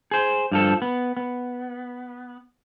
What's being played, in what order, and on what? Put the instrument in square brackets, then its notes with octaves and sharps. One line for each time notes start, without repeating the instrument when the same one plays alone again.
[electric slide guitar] G#4 C5
G2 F3 A4
B3
B3